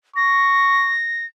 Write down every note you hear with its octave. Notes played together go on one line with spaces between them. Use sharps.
C#6 A#6